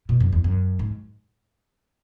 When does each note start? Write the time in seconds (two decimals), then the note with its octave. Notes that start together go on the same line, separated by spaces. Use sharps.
0.09 B2
0.20 F#2
0.33 E2
0.44 F#2
0.79 G#2